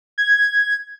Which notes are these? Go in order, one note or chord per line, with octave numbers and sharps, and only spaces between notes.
G#6